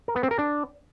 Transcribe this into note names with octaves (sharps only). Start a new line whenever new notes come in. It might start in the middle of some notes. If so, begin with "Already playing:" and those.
A#4
B3
C4
A#4
D4